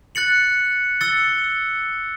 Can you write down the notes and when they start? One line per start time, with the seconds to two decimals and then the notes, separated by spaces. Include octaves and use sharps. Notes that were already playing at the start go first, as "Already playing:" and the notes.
0.15 F#6 A6 C#7 F#7
1.01 E6 A6 C#7 G7